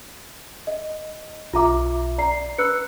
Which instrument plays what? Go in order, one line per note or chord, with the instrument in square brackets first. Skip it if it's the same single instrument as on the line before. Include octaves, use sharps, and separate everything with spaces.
[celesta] D#5
[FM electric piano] B1 E5 [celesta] F4 A#5 D6
[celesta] D5 A#5 C7
[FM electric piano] B4 [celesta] E6 F#6 C#7